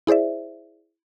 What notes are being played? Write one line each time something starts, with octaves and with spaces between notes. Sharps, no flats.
E4 G#4 C5 D5 E5